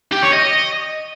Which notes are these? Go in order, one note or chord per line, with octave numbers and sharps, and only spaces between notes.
G4
C#5
D#5